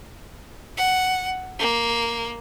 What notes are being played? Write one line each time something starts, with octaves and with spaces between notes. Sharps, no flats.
F#5
A#3